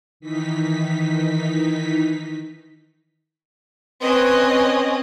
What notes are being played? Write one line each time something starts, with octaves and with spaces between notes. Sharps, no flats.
D#3 E3 D#4 B6
C4 C#4 B4 D#5